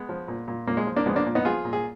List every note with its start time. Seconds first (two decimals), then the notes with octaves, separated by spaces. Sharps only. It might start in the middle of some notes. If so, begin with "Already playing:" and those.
Already playing: G#3 B3
0.09 F3
0.28 A#2
0.48 A#2
0.67 A#2 A#3
0.77 G#3
0.87 F3
0.96 A#3 D4
1.06 F3 G#3 B3
1.16 A#3 D4
1.26 A#2
1.35 B3 D#4
1.45 F3 F4 G#4
1.65 A#2
1.73 G#4